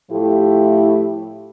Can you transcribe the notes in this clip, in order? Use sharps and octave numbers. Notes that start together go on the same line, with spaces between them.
A2 F3 A3 E4 G4